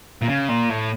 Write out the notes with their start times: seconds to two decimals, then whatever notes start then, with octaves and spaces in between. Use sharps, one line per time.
0.22 A#2
0.29 C#3
0.49 A#2
0.69 A2